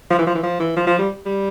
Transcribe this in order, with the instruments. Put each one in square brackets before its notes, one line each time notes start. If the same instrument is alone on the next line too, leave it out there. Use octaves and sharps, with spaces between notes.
[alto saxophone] F3
E3
F3
E3
F3
E3
F3
F3
G3
G3